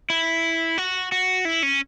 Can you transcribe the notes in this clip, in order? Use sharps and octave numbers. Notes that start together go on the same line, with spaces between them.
E4
F#4
F#4
E4
C#4